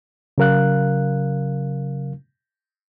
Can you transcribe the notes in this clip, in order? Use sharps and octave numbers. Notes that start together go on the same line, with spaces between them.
C#3 F#3 A#4 F5 F#6